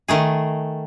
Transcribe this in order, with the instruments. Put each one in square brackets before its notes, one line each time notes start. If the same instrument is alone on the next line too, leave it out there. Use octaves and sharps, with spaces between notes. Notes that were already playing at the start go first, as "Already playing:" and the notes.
[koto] D#3 A3 G#4